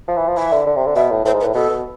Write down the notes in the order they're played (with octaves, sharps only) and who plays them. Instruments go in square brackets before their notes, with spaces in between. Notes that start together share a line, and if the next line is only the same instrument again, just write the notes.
[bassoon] F3
E3
F3
[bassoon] E3 [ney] E5
[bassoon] D3
D3
C3
D3
[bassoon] B2 [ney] E5
[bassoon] A2
[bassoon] A2 [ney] C5
[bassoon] G#2
[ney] B4
[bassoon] A2
[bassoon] B2 [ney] A4
[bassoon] B2